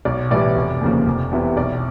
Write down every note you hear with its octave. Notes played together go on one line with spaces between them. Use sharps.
B1 D5
A2 E3 G3 B3 D5
F1
D#2 C#3 F3 A#3
F1
E2 C3 E3
B1 D5